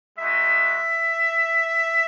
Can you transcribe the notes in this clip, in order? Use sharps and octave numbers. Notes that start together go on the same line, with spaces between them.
G#3 D#4 F#4 E5